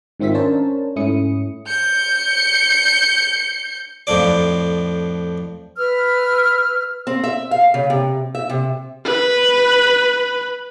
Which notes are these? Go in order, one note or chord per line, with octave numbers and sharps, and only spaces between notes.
G#2 D#3 C4 F4 E5 B6
C#4 D4 A#4 C5 C#5 A5
G#2 A3 C#4 E4 D#6 C#7
G6 C#7
F2 A2 F3 D5
B4 E6 F6
C4
E5
F5
C#3
C3
E5
C3
B4 B5